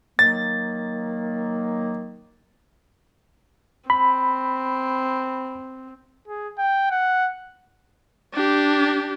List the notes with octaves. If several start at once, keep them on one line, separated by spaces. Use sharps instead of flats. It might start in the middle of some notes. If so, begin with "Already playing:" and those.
D#3 F#3 A#3 A6
C4 B5
G#4
G5
F#5
D4 G4